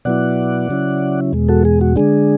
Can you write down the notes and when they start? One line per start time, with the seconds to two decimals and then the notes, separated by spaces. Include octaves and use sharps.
0.05 B2 F#3 B3 E4 D5 F#5
0.70 C#3 F#3 C#4 E4
1.33 E2 B2 G#3
1.49 F#4 A4
1.65 G#4
1.81 F#4
1.96 D3 G#3 D4 G#4